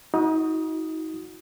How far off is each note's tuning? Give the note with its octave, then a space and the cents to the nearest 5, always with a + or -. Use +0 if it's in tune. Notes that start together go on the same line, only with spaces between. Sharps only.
D#4 +35 F#4 -15 D#6 +0